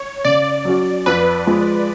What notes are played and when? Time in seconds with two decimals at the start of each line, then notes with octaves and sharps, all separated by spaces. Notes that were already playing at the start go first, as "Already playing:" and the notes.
Already playing: C#5
0.25 C#3 D5
0.65 F#3 C#4 F#4
1.06 F2 B4
1.47 F3 G#3